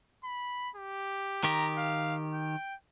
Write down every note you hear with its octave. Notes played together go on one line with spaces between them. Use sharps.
B5
G4
D#3 G4 A#5
F5
G5